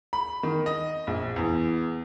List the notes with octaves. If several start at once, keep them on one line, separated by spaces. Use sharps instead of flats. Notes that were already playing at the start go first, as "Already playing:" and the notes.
B5
D#3
D#5
A#1
E2